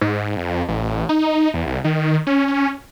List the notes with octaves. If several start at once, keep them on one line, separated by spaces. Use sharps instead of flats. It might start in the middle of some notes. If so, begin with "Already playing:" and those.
G#2
F2
A1
D#4
E2
C2
D#3
C#4